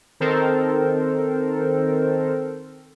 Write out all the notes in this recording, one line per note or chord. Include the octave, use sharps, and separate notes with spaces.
D#3 C4 A4 A#4 C5